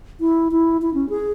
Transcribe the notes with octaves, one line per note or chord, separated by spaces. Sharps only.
E4
E4
E4
C#4
G#4